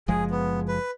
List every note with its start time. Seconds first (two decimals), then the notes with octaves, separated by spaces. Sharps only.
0.08 F#1 F3 G#3 G#4
0.31 B3
0.68 B4